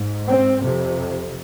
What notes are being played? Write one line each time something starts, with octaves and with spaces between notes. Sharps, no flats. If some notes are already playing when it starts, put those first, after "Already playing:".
Already playing: G#2
C4
F2 C3